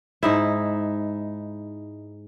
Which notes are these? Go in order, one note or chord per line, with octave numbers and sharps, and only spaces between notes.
G#2 D#4 E4